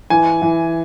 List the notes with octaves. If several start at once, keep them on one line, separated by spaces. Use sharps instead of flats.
E3 G#5
E3